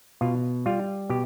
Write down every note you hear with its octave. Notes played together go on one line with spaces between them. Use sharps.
B2 F4
G3 F4
B2 G4